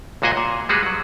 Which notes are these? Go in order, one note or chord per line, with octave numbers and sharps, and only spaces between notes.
C#2 A#2 F#4 G#4 D#5 G#5
A#2
G3 G#3 F#4 G#4 B4
F#3